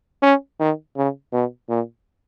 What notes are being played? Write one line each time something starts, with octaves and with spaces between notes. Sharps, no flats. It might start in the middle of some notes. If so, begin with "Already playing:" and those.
C#4
D#3
C#3
B2
A#2